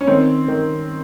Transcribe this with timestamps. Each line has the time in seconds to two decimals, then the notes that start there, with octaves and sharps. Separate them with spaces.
0.01 C#4
0.07 D#3 C4
0.48 D#3